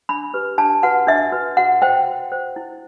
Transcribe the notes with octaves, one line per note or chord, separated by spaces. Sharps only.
D4 B5
G4 B4
D4 A5
F#4 B4 F#5
D4 E5
F#4 B4
F#4 F#5
C5 G5
F#4
C5
E4